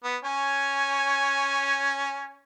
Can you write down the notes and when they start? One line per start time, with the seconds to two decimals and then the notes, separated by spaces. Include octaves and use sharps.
0.04 B3
0.24 C#4 C#5 G#5